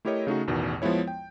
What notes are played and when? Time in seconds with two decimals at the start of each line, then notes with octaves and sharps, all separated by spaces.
0.05 A3 E4 G4 A#4 C#5 D#5
0.27 C#3 A3 D#4 F#4
0.47 A1 E2 B2 D#3
0.82 F3 G#3 B3 E4 C#5
1.08 G5